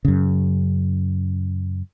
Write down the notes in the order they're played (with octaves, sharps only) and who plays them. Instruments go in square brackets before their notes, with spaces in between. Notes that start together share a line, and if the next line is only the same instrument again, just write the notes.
[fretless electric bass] F#2 C#3